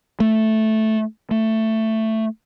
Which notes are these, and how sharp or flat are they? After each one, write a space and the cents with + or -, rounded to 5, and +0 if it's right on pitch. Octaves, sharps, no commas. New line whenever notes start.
A3 -5
A3 +10